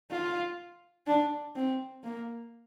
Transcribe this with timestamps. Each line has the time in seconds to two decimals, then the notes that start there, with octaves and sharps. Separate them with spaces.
0.11 F4
1.07 D4
1.55 C4
2.04 A#3